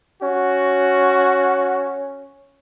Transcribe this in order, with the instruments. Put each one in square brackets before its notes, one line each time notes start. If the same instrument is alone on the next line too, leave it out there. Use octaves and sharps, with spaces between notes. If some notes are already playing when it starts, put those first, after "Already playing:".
[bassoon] C#4 [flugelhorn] F#4